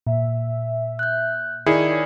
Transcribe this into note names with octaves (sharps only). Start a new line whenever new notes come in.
A#2 E5
F#6 G6
D#3 E4 G#4 D5 C7 C#7
C#5